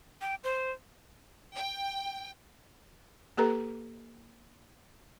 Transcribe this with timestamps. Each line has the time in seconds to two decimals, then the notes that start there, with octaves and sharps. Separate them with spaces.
0.21 G5
0.44 C5
1.55 G5
3.37 A#3 G4 A4 B4 A#5